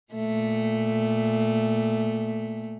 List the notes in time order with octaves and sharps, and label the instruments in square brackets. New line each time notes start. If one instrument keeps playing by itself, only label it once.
[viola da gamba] A#2 A3